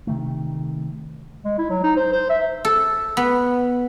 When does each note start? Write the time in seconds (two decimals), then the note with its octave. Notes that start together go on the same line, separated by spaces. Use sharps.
0.07 C3 D#3 A3
1.45 G#3
1.58 E4
1.70 F#3
1.84 D#4
1.96 C5
2.12 C5
2.30 E5
2.65 A4
3.17 B3